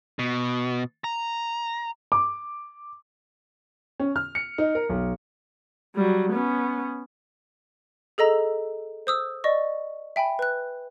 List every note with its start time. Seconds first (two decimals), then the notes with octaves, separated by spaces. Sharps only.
0.19 B2
1.04 A#5
2.12 D6
4.00 C#4
4.16 F6
4.35 C#7
4.58 D#4
4.75 A#4
4.90 B1
5.95 F#3 G3
6.33 B3 C#4
8.18 G#4 A4 D#5 A#5 E6
9.07 C5 D#6 E6
9.44 D5 D#5 C#6
10.16 E5 G5 G#5 B5
10.39 B4 F#6